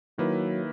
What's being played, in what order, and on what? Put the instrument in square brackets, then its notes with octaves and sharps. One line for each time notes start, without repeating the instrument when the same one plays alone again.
[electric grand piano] D#3 A#3 E4 B4 [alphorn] F#3